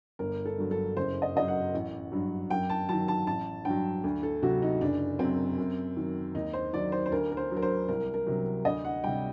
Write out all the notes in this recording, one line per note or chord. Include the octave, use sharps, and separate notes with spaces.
G1 A#4
A4
G2 F#3
A4
F#1 C5
D#5
F#2 F#3 D#5
F#5
A1
G2 F#3
F#2 G5
A5
D#3 F#3 A5
A5
A1 A5
G2 F#3 G5
D2
A4
C3 F#3 F#4
D#4
F#1 D4
F#2 F#3 C4
F#2
D#3 F#3
D#2 D#4
C5
D#3 F#3 D5
C5
C5
D2 A#4
A#4
C5
D3 F#3
A#4
C5
C2 A#4
A#4
C3 F#3
D2 D#5
F#5
C3 G3 G5